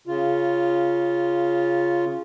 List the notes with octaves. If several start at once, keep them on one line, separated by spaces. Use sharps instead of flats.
C#3 F4